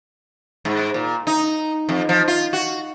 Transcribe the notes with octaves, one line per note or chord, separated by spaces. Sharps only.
G#2
A#2
D#4
F2
F3
F4
F#4